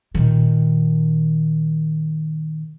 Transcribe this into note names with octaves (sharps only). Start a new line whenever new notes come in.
A#2 D#3